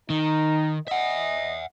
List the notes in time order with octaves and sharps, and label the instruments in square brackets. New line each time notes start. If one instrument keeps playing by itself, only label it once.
[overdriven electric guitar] D#3 [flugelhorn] D#4
[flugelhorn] D#5 [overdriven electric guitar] E5 F#5